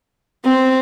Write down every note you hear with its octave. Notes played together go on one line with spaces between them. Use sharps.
C4